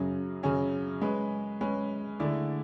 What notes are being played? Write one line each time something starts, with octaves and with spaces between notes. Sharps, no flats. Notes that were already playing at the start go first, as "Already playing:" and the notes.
Already playing: F#2 C#3 F#3 C#4 G#4
F#2 C#3 F#3 C#4 G#4
G#3 C#4 G#4 B4
G#3 C#4 G#4 B4
D3 A3 E4 G#4 D5